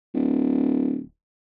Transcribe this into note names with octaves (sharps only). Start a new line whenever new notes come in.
D1